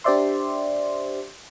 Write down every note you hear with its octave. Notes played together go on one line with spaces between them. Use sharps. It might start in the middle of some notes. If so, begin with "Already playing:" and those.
D4 G4 C5 D5 E5 C6